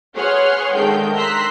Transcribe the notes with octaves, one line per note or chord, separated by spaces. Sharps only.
G#4 B4 C#5 F#5 C6 F6
D3 D#3 G#3 A3 G5 G6
A#5 C6 E6 F#6 B6